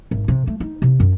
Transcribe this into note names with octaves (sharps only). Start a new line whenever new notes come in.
G#1
C3
A3
D#4
C3
F#2